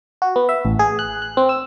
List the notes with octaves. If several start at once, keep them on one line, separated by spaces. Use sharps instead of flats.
F#4
B3
E5
A1
G#4
F#6
F#6
C4
E6